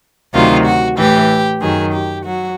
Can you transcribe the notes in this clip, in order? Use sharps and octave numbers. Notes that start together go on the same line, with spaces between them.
D2 C3 D#3 F#3 F4
F#4
A2 E3 G4
F#2 D#3 F#3 G#4
G4
F#3 F#4